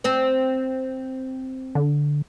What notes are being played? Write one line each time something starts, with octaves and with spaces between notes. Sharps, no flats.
C4 C5
D3